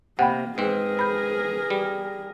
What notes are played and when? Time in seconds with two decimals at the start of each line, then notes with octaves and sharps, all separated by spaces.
0.19 C3 A#3 F#5 G5 B5
0.58 G#2 C4 G#4 A#4 B4
0.99 B5 G6
1.70 G3